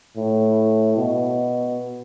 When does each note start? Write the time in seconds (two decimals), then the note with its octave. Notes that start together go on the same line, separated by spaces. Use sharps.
0.17 A2
0.97 B2